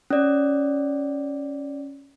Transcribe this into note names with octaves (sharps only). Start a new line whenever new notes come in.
C#4 D5